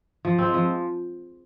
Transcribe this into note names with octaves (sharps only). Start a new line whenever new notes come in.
F3
G#3 C4
F3